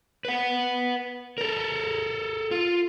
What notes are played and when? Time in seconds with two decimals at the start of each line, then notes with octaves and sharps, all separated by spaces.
0.25 B4 F#5
1.38 A4 A#4
2.51 F4